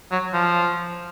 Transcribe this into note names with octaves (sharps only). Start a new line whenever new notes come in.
F#3
F3